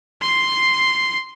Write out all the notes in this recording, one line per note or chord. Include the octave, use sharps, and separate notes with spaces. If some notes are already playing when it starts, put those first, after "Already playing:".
C6 C7